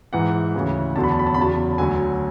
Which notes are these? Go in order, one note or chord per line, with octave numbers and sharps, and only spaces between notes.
G#2 E3 F#5
D2 C#3 E3
E2 D3 F#3 A5
B5
A5
B5
A5
B5
E2 C#3 F#3 A5
D2 D3 F#3 G#5